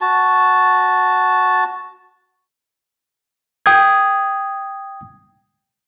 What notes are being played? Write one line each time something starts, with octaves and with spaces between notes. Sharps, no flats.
F#4 A5
G5 D#6 G#6